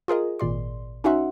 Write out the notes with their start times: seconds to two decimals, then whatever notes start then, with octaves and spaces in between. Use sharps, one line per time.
0.08 F4 G#4 A#4 D#5
0.39 G#1 A#2 D5 C6
1.04 C#4 D#4 F#4 E5 F#5 C6